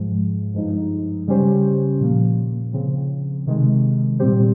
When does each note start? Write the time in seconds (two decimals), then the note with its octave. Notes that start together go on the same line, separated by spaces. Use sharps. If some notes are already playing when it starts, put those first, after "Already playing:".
Already playing: G#2 F3 G#3
0.54 G2 F3 G#3 D#4
1.27 C#3 G3 C#4 G4 C5
2.00 A#2 F3 A#3
2.73 C#3 F3 C4
3.47 C3 D#3 G#3
4.19 A#2 G3 C4 G4 C5